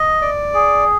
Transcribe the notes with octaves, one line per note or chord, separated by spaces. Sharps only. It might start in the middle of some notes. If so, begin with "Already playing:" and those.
Already playing: D#5
D5
G#4